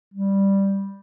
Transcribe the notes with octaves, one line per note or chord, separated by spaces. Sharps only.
G3